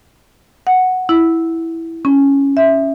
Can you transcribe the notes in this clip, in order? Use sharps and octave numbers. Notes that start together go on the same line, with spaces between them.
F#5
E4
C#4
E5